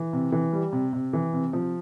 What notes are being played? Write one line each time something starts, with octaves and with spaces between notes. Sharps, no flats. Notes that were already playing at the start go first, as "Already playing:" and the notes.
Already playing: E3
C3
E3
G3
C3
C3
E3
C3
F3